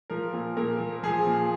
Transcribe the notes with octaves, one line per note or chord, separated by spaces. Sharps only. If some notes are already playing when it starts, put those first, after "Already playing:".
F3 A#4
A#2
A#2 A#4
F3
F3 G#4
A#2